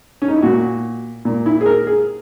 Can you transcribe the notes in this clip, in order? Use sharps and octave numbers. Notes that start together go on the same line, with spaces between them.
C#4
D#4
E4
A#2 F#4
A#2
E4
G#4
A#4
G#4